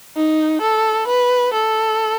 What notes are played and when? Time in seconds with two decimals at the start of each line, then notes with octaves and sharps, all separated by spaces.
0.16 D#4
0.61 A4
1.07 B4
1.53 A4